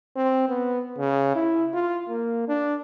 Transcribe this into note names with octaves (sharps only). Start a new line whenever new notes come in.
C4
B3
C#3
E4
F4
A#3
D4